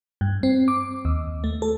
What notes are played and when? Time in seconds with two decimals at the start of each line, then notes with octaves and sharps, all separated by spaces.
0.21 G2
0.43 C4
0.68 D6
1.05 D#2
1.44 A3
1.62 A4